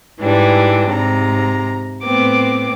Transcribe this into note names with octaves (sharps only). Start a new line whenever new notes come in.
G#2 E3 G3 D4
G#2 C3 A#5
A2 B3 C4 D6